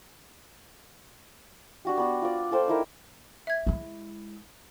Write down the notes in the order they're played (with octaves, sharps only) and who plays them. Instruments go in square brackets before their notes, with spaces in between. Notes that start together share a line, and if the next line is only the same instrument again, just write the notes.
[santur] D4 F#4 G4
B3 D4 F#4
F4 D5
F4 A4 C5 G5
D#4 E4 A#4
[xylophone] E5 G#6
[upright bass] G#3 E4